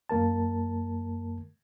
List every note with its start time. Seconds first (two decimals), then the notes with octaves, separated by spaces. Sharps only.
0.09 F#2 A#3 A#4 A5